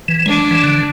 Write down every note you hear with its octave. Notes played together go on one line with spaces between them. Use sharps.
E3
G#3 D4
E3
D3